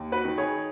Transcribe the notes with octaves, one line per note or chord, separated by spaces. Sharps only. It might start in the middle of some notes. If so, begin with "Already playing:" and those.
Already playing: D#2
F#4 B4
D#3
G#4 C#5